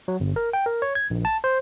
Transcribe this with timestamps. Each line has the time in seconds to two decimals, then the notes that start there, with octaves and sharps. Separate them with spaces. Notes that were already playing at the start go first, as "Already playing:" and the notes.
0.08 F#3
0.20 G1
0.36 A#4
0.53 G5
0.66 A#4
0.82 C#5
0.95 G#6
1.10 A#1
1.25 A5
1.44 C5